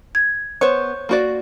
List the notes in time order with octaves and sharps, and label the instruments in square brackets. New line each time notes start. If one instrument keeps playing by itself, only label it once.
[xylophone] G#6
[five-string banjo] B3 [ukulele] C5 C#5
[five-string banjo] A#3 F#4 D5